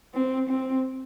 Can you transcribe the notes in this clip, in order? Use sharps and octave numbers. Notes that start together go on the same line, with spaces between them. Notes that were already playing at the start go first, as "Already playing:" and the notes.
C4
C4